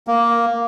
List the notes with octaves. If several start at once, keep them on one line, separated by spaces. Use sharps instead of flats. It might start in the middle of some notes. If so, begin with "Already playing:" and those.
A#3